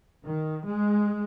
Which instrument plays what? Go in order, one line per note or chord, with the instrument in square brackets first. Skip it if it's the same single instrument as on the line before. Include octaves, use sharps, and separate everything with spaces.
[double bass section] D#3
G#3